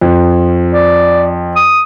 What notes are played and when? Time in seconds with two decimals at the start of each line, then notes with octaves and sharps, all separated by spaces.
0.01 F2
0.73 D5
1.56 D#6